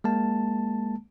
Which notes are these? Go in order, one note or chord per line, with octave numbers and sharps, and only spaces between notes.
G#3 A#3 A5